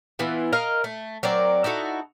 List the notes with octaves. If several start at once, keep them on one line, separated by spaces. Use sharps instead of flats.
E3 B3 E4 F4
A#4 D#5 F5 A#5
A3
F#3 C4 A#4 D5
D#4 E4 F#4 A4